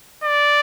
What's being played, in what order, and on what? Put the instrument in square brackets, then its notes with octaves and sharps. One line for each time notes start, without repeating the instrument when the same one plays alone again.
[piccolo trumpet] D5